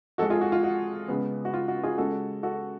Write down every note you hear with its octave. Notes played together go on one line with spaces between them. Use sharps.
F2 F3 G#3 F#4 A4
F4 G#4
F#4
F4
F#4
C#2 C#3 G#3 B3
F#4
F4
F#4
F4 G#4
C#2 C#3 G#3 F#4 A4
F#4 A4